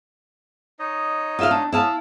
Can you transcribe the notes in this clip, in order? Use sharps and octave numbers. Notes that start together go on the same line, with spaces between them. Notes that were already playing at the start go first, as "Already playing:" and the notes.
D#4 C#5 D#5
F4 E5 F5
D4
B3 C#4 E4 F5 A5